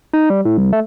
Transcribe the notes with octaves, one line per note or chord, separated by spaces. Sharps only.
D#4
G3
A2
C2
A3